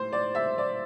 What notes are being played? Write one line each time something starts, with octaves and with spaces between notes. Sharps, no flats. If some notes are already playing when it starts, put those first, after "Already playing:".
Already playing: A2 C5
D5
E5
D5